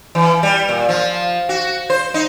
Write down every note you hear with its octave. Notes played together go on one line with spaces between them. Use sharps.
E3
G3
A#2
F3
F#4
C5
D#4